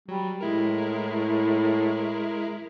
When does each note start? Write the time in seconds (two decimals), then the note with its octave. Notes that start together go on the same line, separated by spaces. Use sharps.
0.08 F#3 G3
0.41 A2 G#3 E4 A#4